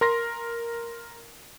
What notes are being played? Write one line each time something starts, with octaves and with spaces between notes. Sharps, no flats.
A#4 C6 A#6